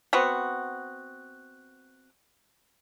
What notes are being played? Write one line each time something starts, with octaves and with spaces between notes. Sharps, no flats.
B3 C4 F#4